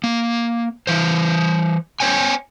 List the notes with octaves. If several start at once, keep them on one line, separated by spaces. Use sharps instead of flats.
A#3
E3 C5
C5 C#5 G5 G#5